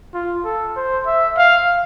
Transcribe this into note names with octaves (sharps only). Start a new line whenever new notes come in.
F4
A4
C5
E5
F5